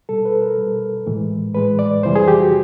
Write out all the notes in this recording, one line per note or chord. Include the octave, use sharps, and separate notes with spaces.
B2 G3 A4
B4
A#4
B2 G3
A2 E3 G#3
A2 E3 G#3 B4
D5
F2 C3 E3 G3 C5
G#4
G4
F#4